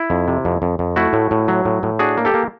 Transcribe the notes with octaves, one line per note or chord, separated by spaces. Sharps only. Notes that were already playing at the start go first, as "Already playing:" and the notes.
Already playing: E4
F2
C3
F2
F2
F2
A3 E4 F#4
A2
A2
F#3
A2
A2
D4 F#4 G#4
A#3
G4 A4
A#3